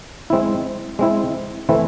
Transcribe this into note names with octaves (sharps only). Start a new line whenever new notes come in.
G#3 C4 E4
G#3 C4 E4
E3 A3 C4 E4